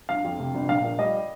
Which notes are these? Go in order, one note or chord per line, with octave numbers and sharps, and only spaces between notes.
G1 F5
F2
C3
G1
A#1 F5
A#2
G3 D#5